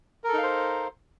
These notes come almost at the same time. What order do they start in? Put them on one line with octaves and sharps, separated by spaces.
A#4 A4 D#4 F5 C5